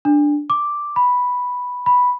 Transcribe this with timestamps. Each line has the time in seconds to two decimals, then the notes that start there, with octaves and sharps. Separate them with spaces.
0.05 D4
0.50 D6
0.96 B5
1.86 B5